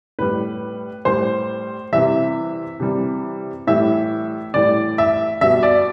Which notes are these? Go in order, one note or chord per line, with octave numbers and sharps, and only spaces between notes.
A2 G3 B4
A2 G3 C5
C3 E3 G3 E5
C3 E3 G3
A2 E3 G3 E5
A2 E3 G3 D5
E5
B2 G3 E5
D5